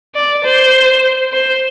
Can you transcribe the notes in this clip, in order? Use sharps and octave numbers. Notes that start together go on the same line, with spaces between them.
D5
C5
C5